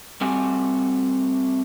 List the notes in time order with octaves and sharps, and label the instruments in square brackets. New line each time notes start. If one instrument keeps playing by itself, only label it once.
[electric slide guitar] G3 A3 C4 F#4 G4 G#5